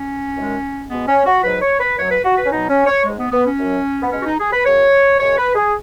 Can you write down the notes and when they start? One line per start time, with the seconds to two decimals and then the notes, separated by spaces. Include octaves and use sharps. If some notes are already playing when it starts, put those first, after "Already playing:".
Already playing: C#4
0.36 F#2 D#3 G#3
0.90 B2 G#3 B3
1.08 C#4
1.26 F#4
1.43 G#2 F#3 B4
1.62 C#5
1.80 B4
1.97 F#2 F#3 C#5
2.11 B4
2.24 F#4
2.37 B4
2.45 C#4
2.51 B2 F#3 D#4
2.69 C#4
2.87 C#5
3.04 G#2 G#3
3.18 B3
3.32 B3
3.45 C#4
3.58 F#2 F#3
4.02 B3
4.12 B2 G#3 C#4
4.20 F#4
4.25 D#4
4.39 G#4
4.52 B4
4.65 F#2 C#3 F#3 C#5
5.19 F#2 C#3 G#3 C#5
5.38 B4
5.55 G#4